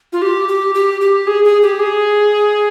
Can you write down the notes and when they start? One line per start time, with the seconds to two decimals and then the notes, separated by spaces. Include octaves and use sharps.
0.13 F4
0.22 G4
0.48 G4
0.75 G4
1.01 G4
1.27 G#4
1.45 G#4
1.62 G4
1.80 G#4